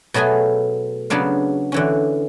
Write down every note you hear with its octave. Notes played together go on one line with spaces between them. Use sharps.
B2 F#3 A3 G#4 G#5
C#3 F#3 B3 D4 F5
D3 E3 C#4